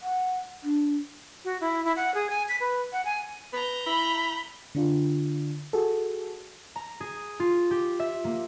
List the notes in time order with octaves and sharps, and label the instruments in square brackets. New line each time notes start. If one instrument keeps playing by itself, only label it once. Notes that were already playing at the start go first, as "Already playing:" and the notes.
[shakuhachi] F#5
D4
[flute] F#4
E4
E4
F#5
G#4
G#5
B6
B4
F#5
G#5
[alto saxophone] B4 [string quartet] A#5 G6
[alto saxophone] E4 [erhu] B5
[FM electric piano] D3 D4 F4
F#4 G#4 A4
[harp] A#5
G#4
F4
G4
E5
A#3